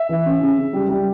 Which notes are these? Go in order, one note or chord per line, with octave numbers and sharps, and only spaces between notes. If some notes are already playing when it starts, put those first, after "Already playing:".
Already playing: E5
E3
C#4
C#3
C#3
G3
G3